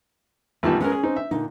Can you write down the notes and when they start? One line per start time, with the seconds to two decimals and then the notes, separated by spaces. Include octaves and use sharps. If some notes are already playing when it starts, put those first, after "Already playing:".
0.63 A1 D#3 G3 B3 F4 A5
0.80 G#3 B3 C#4 A#4
0.92 G#4
1.03 C4 D#4
1.16 E5
1.31 A#2 D3 D#4